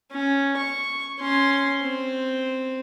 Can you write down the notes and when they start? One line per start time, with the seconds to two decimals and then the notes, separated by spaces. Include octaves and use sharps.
0.12 C#4
0.57 C#6
1.19 C#4 C6
1.82 C4